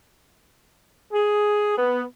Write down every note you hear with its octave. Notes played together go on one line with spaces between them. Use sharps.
G#4
B3